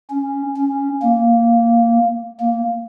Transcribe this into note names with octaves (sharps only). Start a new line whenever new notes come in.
C#4
C#4
A#3
A#3